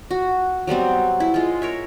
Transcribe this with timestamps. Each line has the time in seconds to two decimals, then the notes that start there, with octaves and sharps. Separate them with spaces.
0.11 F#4
0.67 F#3 G3 B3 C4
1.20 E4
1.34 G#3 F4
1.62 A#4 C#5 E5